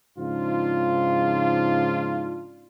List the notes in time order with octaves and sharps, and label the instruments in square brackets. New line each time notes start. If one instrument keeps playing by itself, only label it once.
[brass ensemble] G#2 C#3 F3 D4 D#4 F4